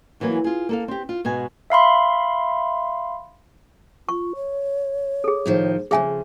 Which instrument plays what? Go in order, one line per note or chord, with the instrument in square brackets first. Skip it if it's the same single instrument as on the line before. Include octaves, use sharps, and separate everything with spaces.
[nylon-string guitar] E2 E3 F#3 A#3 G#5
F4 G#4
A#3 A4 F5
C4 G4
F4
G#2 B2 F#4 G#5
[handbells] E5 F5 B5 C6
[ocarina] F4 [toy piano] C#6
[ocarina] C#5
[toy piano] G#4 A4
[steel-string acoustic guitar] A2 D#3 F3
[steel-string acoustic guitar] F2 A#2 C#3 [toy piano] G#4 E5 G#5